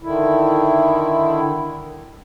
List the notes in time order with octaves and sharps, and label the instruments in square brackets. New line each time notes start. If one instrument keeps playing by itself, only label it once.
[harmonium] D3 D#3 E4